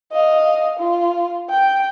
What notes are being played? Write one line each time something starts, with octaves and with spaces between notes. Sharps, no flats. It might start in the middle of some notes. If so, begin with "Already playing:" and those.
D#5 F5
F4
G5